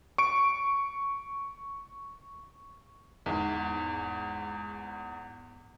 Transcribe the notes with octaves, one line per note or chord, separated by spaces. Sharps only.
C#6 D7
E2 G#2